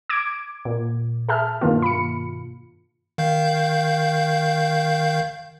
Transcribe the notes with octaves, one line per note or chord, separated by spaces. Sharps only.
D6 G#6 D7
A#2
G#4 E5 A5 F6
G2 B2 D#3 A#3 F4
B5 C#7
D#3 F5 G6